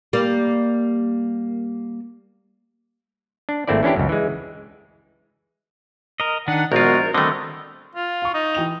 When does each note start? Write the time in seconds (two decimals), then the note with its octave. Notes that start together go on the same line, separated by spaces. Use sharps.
0.13 G3 A#3
3.49 D4
3.68 G#1 A3 A#3 C4 E4 D5
3.83 E3 C#4 D4 E4 G4
3.96 C#2 F#2
4.09 E3 G#3
6.20 A#4 D#5
6.48 D#3 D4 F#5
6.72 A#1 G#3 B3 F4 F#4 A#4
7.14 D3 D#3 G3 A3 C4 D#5
7.95 F4
8.22 F5 C#6
8.34 D#4
8.55 E3 G5 F7